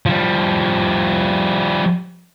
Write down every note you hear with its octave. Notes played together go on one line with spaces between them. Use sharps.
F3 G3